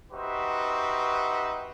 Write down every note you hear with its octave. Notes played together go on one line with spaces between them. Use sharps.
D#4 F#4 G4 B4 C5 E5